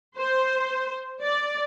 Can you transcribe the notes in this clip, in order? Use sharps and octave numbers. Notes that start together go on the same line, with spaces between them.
C5
D5